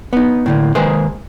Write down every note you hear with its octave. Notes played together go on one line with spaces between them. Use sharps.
B3 D#4
A2 D3 A#3
D#3 G#3 A#3 G#4 B4 C5